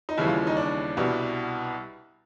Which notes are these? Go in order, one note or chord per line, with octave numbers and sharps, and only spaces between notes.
D#4
D#2 C#3 E3 G3 E4
F4
D#4
D4
C2 B2 G3